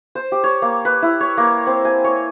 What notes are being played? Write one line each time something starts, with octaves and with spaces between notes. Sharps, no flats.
C5
G4
C#5
A#3
B4
E4
C#5
A#3
C4
G#5
C#5